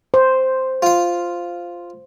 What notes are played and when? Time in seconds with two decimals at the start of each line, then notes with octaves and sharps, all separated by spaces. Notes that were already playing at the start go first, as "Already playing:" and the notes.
0.14 C5
0.82 F4 F5